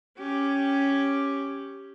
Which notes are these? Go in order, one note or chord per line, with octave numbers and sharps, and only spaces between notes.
C#4 G4